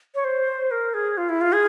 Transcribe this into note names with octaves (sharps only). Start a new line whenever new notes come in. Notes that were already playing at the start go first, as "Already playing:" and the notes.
C#5
C5
A#4
G#4
F4
E4
F4
G#4